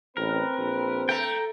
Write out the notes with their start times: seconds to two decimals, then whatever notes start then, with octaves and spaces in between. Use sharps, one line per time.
0.17 A1 C4 A#4 B4
0.58 A#1
1.09 A3 G5 A#5